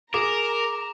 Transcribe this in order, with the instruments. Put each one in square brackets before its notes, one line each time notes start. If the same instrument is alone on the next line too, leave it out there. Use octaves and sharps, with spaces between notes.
[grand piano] G#4 [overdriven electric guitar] A#4 [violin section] A#5 [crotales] D6